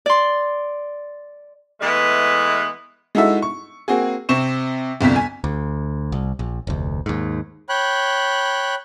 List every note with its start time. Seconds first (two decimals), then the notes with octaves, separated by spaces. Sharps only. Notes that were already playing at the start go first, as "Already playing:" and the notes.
0.06 D5 C6
1.80 E3 G#3 A3 B3
3.15 G#3 D#4 E4 F#4 A4 E5
3.42 C#6
3.88 A#3 C4 F#4 G#4
4.29 C3 C4 C#6 E7
5.01 G1 C2 F2 B6
5.16 G#5
5.44 D2
6.12 C2
6.39 A#1
6.67 F1 D2
7.06 D#2 G#2
7.69 C#5 G5 B5 F#6